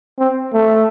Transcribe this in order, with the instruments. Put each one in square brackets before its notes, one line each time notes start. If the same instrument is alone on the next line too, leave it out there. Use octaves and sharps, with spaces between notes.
[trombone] C4
A3